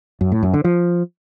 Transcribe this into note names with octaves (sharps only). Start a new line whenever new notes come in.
F#2
A2
F#2
D3
F3